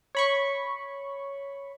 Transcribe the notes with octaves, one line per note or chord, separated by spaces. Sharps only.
C#5 B5 C#6